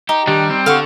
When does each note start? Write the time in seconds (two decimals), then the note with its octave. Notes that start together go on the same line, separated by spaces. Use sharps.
0.09 D#4 G4
0.27 D#3 G3 D4 G4
0.50 C4
0.66 D3 A4 F5 F#5 C#6